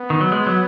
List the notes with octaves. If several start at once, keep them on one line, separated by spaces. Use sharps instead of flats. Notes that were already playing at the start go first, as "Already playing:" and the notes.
Already playing: B3
D#3
F#3
G#3
F#3